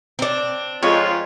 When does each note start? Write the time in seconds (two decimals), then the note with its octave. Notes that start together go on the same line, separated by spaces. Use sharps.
0.19 C4 D4
0.83 F2 G#3 F4 C#5